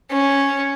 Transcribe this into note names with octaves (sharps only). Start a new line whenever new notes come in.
C#4